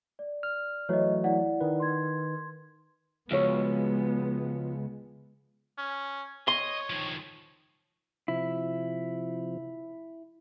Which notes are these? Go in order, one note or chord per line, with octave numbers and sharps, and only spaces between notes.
D5
F6
E3 F#3 A3 C#5 D#5
E4 D5 F#5
D#3 B4
C6 G#6
C#2 F3 G#3 B3 F#4 C#5
C#4
C#5 D#5 C6
D#3 F3
C3 F3 E4